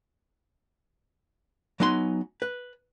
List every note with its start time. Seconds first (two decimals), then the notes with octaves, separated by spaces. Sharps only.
1.80 F#3 B3 D#4 G#5 C6
2.42 B4